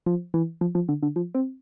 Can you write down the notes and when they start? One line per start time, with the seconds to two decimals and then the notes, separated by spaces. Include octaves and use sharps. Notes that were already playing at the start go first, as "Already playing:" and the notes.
0.06 F3
0.34 E3
0.61 F3
0.75 F3
0.89 D3
1.03 D3
1.16 F3
1.35 C4